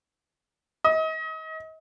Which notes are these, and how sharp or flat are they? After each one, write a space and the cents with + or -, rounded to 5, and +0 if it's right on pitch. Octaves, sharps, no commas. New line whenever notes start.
D#5 +35